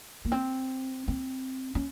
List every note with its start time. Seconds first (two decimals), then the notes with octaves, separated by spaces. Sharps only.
0.25 A#3
0.32 C4
1.08 C4
1.75 C#4